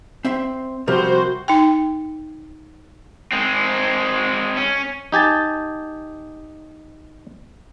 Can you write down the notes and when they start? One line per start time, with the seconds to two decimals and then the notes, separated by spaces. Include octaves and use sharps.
0.25 C4 E5 C6
0.87 C3 F3 G3 F#4 A#4 C5
1.48 D#4 G5
3.32 G#3 C4
4.57 C#4
5.12 D#4 G4 G#5 A5